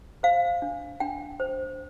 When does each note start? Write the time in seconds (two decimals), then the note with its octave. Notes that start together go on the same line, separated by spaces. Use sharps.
0.23 C5 F5
0.62 D4
1.00 D4 G5
1.40 C5